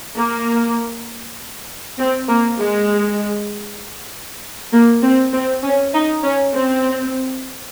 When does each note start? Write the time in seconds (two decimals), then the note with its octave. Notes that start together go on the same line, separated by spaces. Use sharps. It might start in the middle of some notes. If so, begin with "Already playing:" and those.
0.16 A#3
1.99 C4
2.28 A#3
2.59 G#3
4.72 A#3
5.02 C4
5.32 C4
5.63 C#4
5.94 D#4
6.24 C#4
6.54 C4